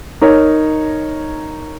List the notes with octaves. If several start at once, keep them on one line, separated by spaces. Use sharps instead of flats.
D#4 A#4 C#5